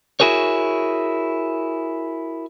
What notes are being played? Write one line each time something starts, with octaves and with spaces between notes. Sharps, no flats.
E4 F#4 G#4 A#4 C#5